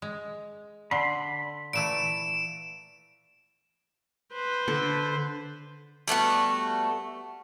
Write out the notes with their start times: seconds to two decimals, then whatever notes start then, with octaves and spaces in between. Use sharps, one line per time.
0.02 G#3
0.91 D3 B5 C6
1.73 A#2 E3 A3 D7 E7
4.33 B4 C5
4.68 D3 A4
6.08 G3 A3 B3 F#4